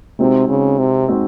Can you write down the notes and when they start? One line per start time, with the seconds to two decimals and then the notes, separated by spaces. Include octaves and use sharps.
0.19 C3 G#3 C4 D#4 F#4
0.49 C#3
0.79 C3
1.08 G#3 C4 D#4 F#4